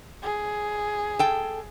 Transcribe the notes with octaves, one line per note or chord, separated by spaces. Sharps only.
G#4
A4 G5